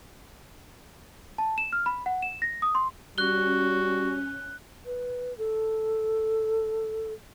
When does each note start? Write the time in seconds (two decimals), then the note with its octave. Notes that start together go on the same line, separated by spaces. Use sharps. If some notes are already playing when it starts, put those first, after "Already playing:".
1.38 A5
1.58 E7
1.73 F6
1.86 B5
2.06 F#5
2.22 E7
2.42 A#6
2.62 D#6
2.75 C6
3.18 G3 C#4 F#4 F#6 G7
4.86 B4
5.38 A4